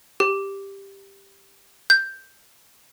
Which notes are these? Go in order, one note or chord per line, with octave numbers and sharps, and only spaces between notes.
G4
G6